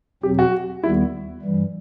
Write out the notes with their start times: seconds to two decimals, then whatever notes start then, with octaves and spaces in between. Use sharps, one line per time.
0.23 E2 B2 F#3 C4 G4
0.39 F#4
0.83 D#2 D#3 G3 B3 E4
1.42 G2 E3 G3